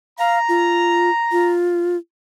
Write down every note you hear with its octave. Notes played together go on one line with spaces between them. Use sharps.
F5 A#5
F4
F4